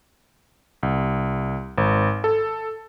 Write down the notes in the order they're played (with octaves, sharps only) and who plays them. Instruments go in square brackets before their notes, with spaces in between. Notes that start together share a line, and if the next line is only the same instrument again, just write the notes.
[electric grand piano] C2
G#1
A4